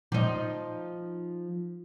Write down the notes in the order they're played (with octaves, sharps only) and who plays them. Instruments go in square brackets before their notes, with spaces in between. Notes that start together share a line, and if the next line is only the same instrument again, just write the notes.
[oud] F3 D#4